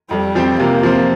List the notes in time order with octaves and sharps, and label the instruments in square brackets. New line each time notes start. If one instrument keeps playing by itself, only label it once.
[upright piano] F2 [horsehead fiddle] G3
[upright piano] F3 C4 G4
[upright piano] C3 [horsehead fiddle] A#3
[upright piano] F3 C4